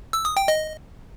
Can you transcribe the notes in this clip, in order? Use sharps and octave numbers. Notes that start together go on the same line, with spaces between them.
E6
D#6
G5
D#5